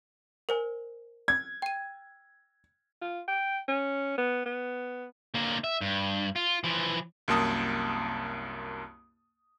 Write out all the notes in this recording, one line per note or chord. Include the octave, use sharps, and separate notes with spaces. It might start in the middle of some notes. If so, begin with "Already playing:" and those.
A#4 C5 G#5
G#6
G5 D#7
F4
G5
C#4
B3
B3
D3 A#3
E5
G2
F4
E3 F3
C2 F#2 A#3 A5 D#6